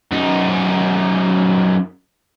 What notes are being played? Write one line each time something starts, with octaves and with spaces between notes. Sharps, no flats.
F#2 D#4